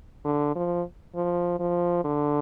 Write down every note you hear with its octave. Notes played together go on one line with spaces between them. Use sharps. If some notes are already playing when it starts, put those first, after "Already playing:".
D3
F3
F3
F3
D3